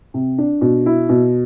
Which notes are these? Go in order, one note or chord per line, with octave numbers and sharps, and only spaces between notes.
C3
D4
B2
E4
B2